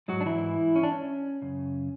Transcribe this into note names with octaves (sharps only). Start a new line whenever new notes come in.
G#2 F#3 G#3 F#4
D4
E3 E4
C#4
D4
C#4
F#2 C#3